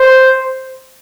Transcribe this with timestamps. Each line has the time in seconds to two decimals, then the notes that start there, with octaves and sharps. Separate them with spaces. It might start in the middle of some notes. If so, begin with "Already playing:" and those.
Already playing: C5